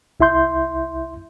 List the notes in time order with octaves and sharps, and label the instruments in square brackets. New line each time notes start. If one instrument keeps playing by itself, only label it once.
[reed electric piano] C2 E4 E5 C6 G6